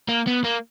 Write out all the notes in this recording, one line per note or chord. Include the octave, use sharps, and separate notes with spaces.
A#3
B3
A#3